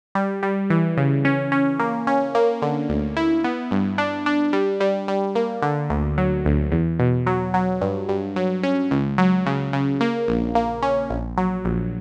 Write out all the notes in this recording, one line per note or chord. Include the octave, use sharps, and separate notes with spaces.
G3
G3
E3
C#3
C#4
C#4
A#3
C#4
A#3
D3
D2
E4
B3
G2
D4
D4
G3
G3
G3
A#3
D3
D2
F#3
D2
E2
B2
F#3
F#3
G2
G2
F#3
C#4
C#2
F#3
C#3
C#3
A#3
A#1
A#3
C#4
A#1
F#3
A#1